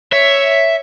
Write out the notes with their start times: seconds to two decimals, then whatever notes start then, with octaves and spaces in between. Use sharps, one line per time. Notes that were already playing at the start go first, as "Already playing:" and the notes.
0.13 C#5 E5